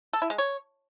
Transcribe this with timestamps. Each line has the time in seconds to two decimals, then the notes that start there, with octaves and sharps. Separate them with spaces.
0.13 A4
0.22 E4
0.30 G#3
0.38 C#5